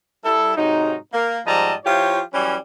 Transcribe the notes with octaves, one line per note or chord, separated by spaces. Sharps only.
G3 E4 A4
G#2 C3 F#3 D#4
A#3
G#2 F3 G3 D#5 A5 A#5
F3 E4 F4 G4 C#5
E3 F#3 G3 C#4